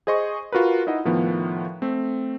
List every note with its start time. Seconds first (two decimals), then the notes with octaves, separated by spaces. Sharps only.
0.07 G#4 C5 D#5 C6 C#6
0.52 F4 F#4 A#4 B4
0.87 D#4 E4 D#5 F#5
1.05 A2 D#3 F3 B3
1.82 A3 C4